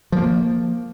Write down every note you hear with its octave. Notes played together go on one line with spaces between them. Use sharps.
F3 A#3